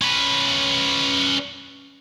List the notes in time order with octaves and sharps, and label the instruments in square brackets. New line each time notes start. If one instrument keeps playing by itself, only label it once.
[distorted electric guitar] C#4 B4